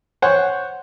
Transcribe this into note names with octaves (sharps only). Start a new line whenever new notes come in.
C5 C#5 F#5